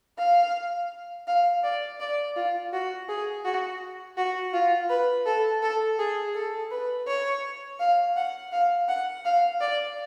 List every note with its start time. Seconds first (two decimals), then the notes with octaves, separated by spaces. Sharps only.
0.18 F5
1.27 F5
1.63 D5
2.00 D5
2.36 F4
2.73 F#4
3.09 G#4
3.45 F#4
4.17 F#4
4.54 F4
4.90 B4
5.26 A4
5.63 A4
5.99 G#4
6.35 A4
6.71 B4
7.07 C#5
7.80 F5
8.16 F#5
8.52 F5
8.88 F#5
9.25 F5
9.60 D5